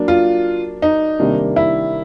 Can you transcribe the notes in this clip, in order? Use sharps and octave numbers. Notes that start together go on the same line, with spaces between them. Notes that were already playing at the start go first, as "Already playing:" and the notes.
Already playing: F#3 A#3 D4
F4
D#4
C3 D#3 G3 A#3 D4
E4